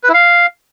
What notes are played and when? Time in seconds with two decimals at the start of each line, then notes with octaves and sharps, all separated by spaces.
0.04 B4
0.09 E4
0.14 F5